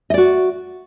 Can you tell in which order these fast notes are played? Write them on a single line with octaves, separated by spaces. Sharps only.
D#5 D5 F#4